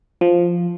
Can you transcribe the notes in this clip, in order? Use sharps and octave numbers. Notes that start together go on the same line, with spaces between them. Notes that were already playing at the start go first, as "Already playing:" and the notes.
F3